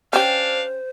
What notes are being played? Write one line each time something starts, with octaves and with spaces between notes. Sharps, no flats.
C#4 D4 G4 C5 F5